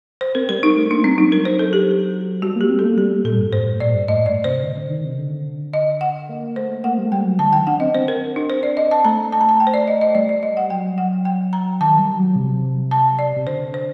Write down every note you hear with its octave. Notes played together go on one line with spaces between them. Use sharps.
C5
C4 A#4
G3 A#4
G3 D#4
A3
A#3 D4
G3 C4
F#3 D#4
F#3 A#4
C5
A4
G4
G3 F#4
A#3 G4
C4
A#3 A4
G3 G4
A#2 A4
G2
A2 C5
A2
A#2 D5
G2
A2 D#5
D5
C3 C5
D3
D3
D#3
C3
D3
D#5
F#5
A#3
A3 C5
A#3 F#5
G3
A3
G3 G5
F#3
D3 A5
D#3 G5
D4 F#5
C4 D#5
C4 C5
A#4
D4
C5
D5
D#5
A5
A3 A#5
A5
A#5
A5
G5
C5
D5
D#5
D#5
G3 D5
D5
D#5
F#5
F#3 G5
F#5
G5
A#5
D#3 A5
G3
F#3
C3
A5
D5
C3
D3 C5
C5